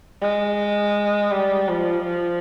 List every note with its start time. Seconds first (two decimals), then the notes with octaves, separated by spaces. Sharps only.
0.21 G#3
1.31 G3
1.68 F3
2.04 F3